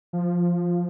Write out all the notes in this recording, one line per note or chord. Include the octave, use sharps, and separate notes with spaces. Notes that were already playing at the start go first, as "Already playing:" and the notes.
F3